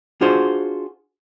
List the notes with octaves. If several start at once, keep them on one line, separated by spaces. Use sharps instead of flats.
D4 F4 F#4 G#4 C5